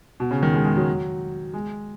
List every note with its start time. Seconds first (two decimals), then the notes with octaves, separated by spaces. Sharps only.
0.20 B2
0.31 C#3
0.43 D#3
0.54 G#3
0.65 G#3
0.76 F#3
1.54 G#3